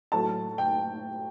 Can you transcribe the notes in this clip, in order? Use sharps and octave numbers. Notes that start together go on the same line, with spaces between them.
A2 F#3 A3 A5
G5